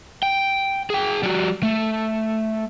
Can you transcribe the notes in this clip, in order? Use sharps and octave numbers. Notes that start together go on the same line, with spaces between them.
G5
G#4 G5
G3 F#4
A3